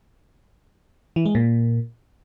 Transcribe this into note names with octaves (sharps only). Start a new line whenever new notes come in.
E3
G#3
A#2